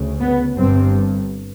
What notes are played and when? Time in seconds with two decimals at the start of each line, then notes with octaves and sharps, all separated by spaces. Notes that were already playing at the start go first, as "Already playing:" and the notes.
Already playing: D2 C#3
0.19 B3
0.56 G1 G2 C4